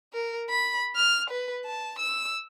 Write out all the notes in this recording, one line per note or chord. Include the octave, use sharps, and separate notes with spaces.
A#4
B5
F6
B4
A5
E6